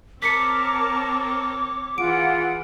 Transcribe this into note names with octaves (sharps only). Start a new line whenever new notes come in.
C4 A#4 C#5 A5 D6 B6 C#7
E3 F4 G#4 F#5 D7